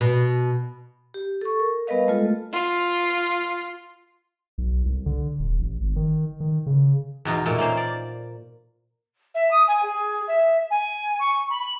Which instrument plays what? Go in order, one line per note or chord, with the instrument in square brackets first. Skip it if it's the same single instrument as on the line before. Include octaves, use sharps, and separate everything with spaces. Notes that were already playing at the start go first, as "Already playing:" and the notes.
[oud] B2
[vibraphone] G4
A4 C#6
A#4
G3 B3 A#4 B4 D#5 F5
G#3 A3 F4 A4
[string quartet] F4
[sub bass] B1
C2
D3
D#1
A1
G#1
D#3
D#3
C#3
[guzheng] E2 B2 D#4 F4
A#2 A3
A#3 C#4 C5 F5
D5
[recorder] E5
D#6
G#5
G#4
E5
G#5
C#6
B5